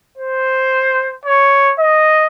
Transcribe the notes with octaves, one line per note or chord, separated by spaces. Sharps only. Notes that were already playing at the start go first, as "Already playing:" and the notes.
C5
C#5
D#5